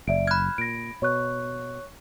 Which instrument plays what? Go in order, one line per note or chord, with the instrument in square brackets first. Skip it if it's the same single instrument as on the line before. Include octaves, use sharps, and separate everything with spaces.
[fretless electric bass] F#1 [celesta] D5 E5 D7
[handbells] B5 G#6 [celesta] F6 F#6
[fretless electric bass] A#2 [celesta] A#6 D7
[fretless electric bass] B2 [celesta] C#5 C#6 F#6